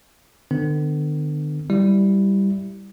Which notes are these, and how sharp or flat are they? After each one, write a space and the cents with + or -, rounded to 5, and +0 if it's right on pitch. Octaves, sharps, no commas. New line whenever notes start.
D3 +40 B3 +40
G3 +0 E4 +0